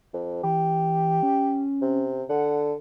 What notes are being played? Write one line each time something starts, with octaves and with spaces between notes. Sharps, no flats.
F2
E3 G4
C#4
C3
D3 F#5